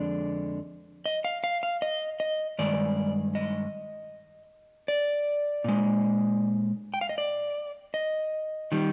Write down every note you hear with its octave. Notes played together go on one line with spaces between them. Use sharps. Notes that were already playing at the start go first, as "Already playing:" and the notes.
Already playing: F2 D3 G#3 D5
D#5
F5
F5
F5
D#5
D#5
G2 D#3 G#3 D5
D#5
D5
A#2 G#3
G5
F5
D#5
D5
D#5
D#3 G3